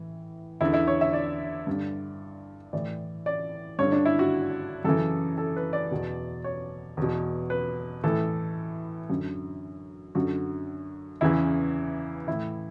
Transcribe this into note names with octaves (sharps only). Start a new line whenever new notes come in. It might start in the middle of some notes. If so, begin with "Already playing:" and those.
Already playing: A2 E3
E2 D3 E4
E4
C#5
E5
D5
G2 D3
A2 E3 D5
D5
G2 D3 C#5
D4
E4
F#4
F#2 C#3 E3 A4
A4
B4
D5
E2 B2
C#5
E2 B2
B4
A2 E3 A4
F#2 D3
F#2 D3 F#4
E2 C#3 E3 E4
A2 E3 E4